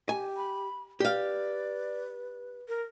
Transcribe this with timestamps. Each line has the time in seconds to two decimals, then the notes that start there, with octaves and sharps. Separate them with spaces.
0.09 G4 G#5
0.37 B5
1.00 G4 B4 D5 F5
2.68 A#4